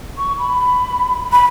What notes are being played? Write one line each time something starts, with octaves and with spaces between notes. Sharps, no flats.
C#6
B5
B5